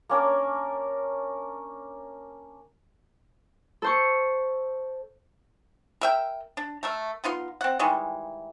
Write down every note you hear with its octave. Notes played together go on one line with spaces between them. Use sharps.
A#3 C#4 D4 A#4
A4 C5 C#6
A#4 E5 G5
D4
A3 A#4 E5
B3 D#4 F4 C6
C4 F#5
D#3 E3 G3 G#3